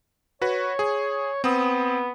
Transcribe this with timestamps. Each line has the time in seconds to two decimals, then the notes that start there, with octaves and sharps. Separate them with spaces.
0.42 F#4 B4 C#5
0.79 G#4
1.44 B3 C4 D#6